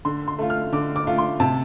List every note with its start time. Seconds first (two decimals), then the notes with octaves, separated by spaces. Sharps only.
0.05 D3 C6
0.28 C6
0.39 A3 F4
0.50 F6
0.72 D3 D6
0.96 D6
1.07 A3 F4
1.18 C6
1.40 C3 A5